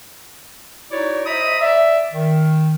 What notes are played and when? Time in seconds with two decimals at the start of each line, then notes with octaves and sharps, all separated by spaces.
0.91 D#4 E4 F#4 C#5 D5
1.26 C5 D#5 E5 A#5 B5 D#6
1.61 D5 E5
2.14 D#3